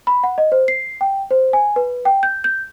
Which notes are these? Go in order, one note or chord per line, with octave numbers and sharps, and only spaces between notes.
B5
F#5
D#5
C5
C7
G5
C5
G#5
B4
G5
G6
G6